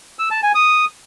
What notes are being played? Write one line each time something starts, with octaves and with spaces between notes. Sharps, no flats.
E6
A5
G#5
D#6